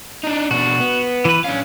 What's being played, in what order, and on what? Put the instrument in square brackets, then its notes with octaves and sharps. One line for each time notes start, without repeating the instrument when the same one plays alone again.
[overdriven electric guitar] D4 D#4
[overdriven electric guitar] B2 D4 [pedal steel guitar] F#4
[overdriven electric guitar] B3
[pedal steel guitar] E3 B4
[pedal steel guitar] C#4 [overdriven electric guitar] D4 F5